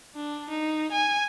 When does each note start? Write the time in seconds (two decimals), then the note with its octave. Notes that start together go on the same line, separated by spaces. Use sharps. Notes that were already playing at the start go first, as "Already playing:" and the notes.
0.15 D4
0.50 D#4
0.92 G#5